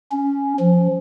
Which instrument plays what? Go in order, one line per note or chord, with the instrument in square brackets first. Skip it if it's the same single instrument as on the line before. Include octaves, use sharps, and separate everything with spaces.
[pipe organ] C#4
F3